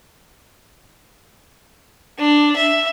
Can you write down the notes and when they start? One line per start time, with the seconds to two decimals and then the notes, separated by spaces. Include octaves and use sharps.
2.19 D4
2.56 E5